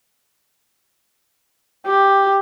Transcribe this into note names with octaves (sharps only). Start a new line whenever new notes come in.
G4